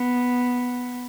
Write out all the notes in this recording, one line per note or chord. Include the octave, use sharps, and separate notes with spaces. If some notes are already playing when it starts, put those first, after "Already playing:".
Already playing: B3